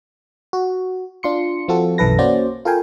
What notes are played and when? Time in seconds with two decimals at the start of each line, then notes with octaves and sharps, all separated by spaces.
0.53 F#4
1.23 D4 F4 C6 C#7
1.68 F3 C4 F4 F#4 A4
1.98 B1 F#2 E3 A4 B4 A#6
2.19 A#3 C#4 F#4 C5 D5
2.65 F4 A4 A#4 F5 G5 G#5